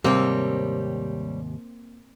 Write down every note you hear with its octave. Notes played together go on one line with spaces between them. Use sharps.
D#2 G#2 C3 G3 A#3 C4 C#5